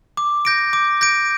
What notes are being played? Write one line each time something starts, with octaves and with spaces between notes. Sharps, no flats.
D6
G6 A#6 D7
D6
G6 A#6 D7